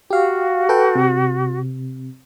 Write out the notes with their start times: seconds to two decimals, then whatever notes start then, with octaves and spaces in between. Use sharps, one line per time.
0.11 F#4 G4 F5
0.69 A4 B4 G5
0.95 C3